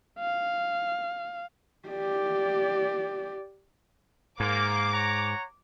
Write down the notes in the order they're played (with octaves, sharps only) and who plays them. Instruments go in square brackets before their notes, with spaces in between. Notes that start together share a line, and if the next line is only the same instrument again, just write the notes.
[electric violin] F5
[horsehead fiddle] G4 D5
[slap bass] G#2 [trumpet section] A#3 [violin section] D6
[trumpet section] C#5 F#5 A#5